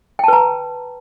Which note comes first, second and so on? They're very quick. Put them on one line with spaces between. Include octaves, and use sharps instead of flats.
G5 A5 B4 A#5